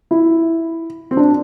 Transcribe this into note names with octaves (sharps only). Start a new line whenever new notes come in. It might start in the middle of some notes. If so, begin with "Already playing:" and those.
E4
C4
D4